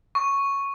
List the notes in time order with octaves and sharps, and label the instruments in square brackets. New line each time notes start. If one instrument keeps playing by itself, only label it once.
[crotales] C#6